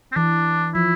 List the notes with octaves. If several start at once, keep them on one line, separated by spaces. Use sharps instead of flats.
C4
E3 D4
F3 E4